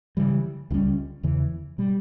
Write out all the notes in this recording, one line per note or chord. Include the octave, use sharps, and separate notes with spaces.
C#3 E3 G3
C#2 C#3 G3 C#4
E2 C#3 E3
B2 G3